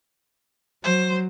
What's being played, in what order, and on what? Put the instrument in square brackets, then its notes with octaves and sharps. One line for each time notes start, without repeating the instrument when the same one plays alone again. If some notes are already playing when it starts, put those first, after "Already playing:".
[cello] F#3 [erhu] C5